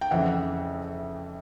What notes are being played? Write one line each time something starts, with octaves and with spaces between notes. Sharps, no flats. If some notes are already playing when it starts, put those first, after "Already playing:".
G5
F2 C#3 E3 E5 F#5